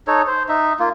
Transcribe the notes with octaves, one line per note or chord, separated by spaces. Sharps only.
D#4 A4 C#5
C5
D#4 E5
A#3 F4